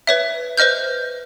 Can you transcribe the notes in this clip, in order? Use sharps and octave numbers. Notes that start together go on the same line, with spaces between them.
B4 C#5 E5
B4 C5 D#5 F6 G6